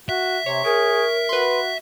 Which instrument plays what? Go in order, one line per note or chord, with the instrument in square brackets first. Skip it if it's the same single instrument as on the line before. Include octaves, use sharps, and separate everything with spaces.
[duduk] F#4 [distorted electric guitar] E5
[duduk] C3 [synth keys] C#5
[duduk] G#4 [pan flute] A#4
[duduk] F#4 [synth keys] B4 C6